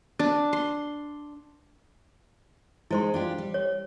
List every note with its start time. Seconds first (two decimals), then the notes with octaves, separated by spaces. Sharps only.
0.19 D4
0.53 C6
2.91 G#3 D#4 E4 C5 C6
3.14 D4 F4 G4
3.38 G3
3.54 C#5